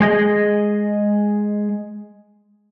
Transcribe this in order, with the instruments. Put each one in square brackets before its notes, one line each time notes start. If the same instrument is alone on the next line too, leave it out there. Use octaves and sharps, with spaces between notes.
[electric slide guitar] G#3 G#4 D#5